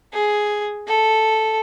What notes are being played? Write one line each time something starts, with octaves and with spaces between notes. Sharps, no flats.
G#4
A4